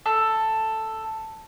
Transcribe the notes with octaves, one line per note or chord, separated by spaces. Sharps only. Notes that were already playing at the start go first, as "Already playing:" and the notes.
A4